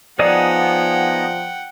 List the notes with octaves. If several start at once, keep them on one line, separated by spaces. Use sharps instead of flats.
F3 B3 D#4 G#4 D5 F#5 G5